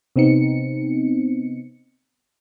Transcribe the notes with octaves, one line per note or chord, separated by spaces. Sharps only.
C3 B3 C4 D#4 C#7